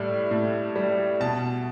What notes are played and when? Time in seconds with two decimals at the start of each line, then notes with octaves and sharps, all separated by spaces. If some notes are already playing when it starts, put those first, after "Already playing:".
Already playing: A2 G3 E5
0.31 A2
0.76 G3
1.20 B2 A5